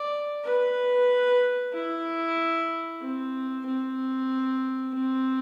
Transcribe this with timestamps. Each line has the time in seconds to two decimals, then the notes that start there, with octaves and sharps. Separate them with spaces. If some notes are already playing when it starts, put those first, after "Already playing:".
Already playing: D5
0.44 B4
1.73 E4
3.01 C4
3.66 C4
4.94 C4